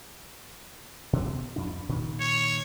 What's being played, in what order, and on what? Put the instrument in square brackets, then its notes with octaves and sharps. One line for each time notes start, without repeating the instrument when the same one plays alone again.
[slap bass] B2
F2 D4
A#2 D#3
[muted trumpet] C#5